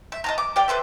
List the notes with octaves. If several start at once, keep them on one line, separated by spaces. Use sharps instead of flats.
E5
D#5 A5 A#5
D6
G4 D5 G5
A4 B4 C5 E5